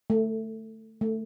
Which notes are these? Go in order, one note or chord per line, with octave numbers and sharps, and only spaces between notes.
A3
A3